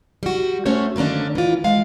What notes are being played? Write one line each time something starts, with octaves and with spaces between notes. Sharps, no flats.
G3 F#4
A3 C#4 F#4 C5 C#5
D3 D#3 A#3 C#4 D4
E3 F4
G#3 F5